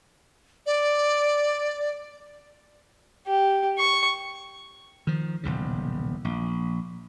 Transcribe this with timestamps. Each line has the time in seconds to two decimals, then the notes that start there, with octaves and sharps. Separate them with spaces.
0.66 D5
3.27 G4
3.78 C#6
5.07 D#3 F3
5.43 D#1 B1 E2 C#3
6.25 A#1